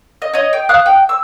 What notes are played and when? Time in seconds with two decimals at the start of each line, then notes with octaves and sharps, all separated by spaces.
0.22 D#5
0.33 C#5 D#5
0.53 G5
0.69 F5 D#6 F#6
0.86 G5
1.09 E6